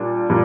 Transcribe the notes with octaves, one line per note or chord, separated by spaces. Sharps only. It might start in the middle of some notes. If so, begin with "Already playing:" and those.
Already playing: A#2 G3 D4
A#2 G3 D4